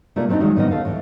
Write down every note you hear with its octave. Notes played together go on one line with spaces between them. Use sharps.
C3 A3 A#3 F4 D5
F#3 A3 C4 D4 D#4
D#3 E3 F#3 G#3
A2 D3 D#3 B3 C#4 D#5
D2 A4 F5
A2 E3